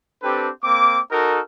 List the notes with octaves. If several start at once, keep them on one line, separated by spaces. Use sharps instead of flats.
C4 D4 G4 A4 B4
A#3 C4 D6
D#4 F#4 A4 A#4